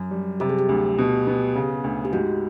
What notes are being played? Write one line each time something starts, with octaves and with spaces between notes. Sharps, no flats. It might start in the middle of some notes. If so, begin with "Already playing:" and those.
Already playing: F#2
G3
C3 G4
G#4
G4
D2
B2
B3
C#3
D2
G4
G#2 F#4